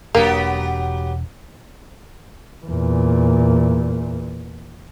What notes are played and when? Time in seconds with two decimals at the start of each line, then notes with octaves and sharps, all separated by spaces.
0.15 E1 F#3 A#3 B3 D4 G4
2.66 E2 A#2